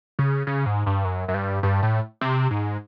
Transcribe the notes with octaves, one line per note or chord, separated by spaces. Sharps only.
C#3
C#3
G#2
G2
F#2
F#2
G2
G2
A2
C3
G#2